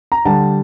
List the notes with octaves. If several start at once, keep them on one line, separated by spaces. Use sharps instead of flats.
A#5
D3 G3 A5